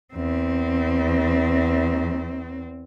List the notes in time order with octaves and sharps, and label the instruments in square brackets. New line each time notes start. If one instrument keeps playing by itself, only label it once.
[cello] E2 C4